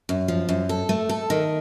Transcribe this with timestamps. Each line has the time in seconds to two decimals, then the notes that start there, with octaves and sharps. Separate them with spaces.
0.09 F#2
0.28 F3
0.49 F#2
0.69 A4
0.89 A3
1.09 A4
1.30 D#3